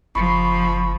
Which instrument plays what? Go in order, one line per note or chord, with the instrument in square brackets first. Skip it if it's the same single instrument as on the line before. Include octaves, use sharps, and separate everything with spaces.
[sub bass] F#1 [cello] F3 [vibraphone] B5 C#6